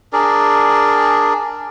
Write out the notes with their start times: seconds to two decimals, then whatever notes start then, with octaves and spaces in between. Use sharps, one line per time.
0.13 D4 G#4 A#4 D5